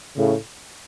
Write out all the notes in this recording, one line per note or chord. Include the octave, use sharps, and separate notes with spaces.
A2 C#3